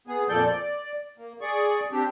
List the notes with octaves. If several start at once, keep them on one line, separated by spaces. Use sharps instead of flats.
B3 G#4
F2 A#2 F3 A4 D5 G6
D5
A#3
G#4 D5 C#6
C4 D4 G4